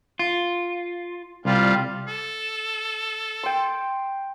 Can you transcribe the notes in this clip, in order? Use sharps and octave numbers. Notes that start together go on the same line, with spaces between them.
F4
C2 G3 F4
A4
G5 C6